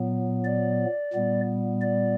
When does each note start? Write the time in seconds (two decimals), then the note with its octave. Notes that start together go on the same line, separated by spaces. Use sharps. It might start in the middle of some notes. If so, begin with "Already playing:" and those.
Already playing: A#2 F#3 B3
0.44 D5
1.13 A#2 G3 B3
1.81 D5